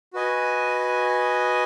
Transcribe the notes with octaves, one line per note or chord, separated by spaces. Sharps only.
F#4 B4 D#5 G#5